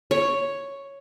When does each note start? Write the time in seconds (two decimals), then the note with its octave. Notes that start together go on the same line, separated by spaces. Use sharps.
0.11 C#5